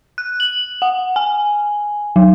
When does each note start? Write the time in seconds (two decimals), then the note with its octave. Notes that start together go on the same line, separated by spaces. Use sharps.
0.18 F#6
0.40 F#7
0.82 F#5
1.16 G#5
2.16 F#3